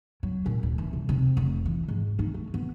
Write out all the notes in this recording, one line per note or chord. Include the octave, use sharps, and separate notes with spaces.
F#3
A#2
D1
E3
C2
C3
F1
E3
G#2
D#4
A3
B3